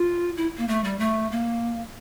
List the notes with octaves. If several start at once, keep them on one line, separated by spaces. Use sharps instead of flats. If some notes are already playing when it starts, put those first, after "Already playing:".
Already playing: F4
E4
A#3
A3
G3
A3
A#3